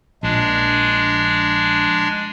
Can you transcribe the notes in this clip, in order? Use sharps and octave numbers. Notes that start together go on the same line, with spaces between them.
A#1 G#3 D4